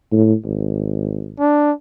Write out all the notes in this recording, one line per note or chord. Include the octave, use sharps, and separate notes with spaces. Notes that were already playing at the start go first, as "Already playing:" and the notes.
A2
G#1
D4